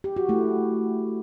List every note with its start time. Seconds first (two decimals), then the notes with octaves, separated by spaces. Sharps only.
0.04 G4
0.16 F#4
0.29 A3 E4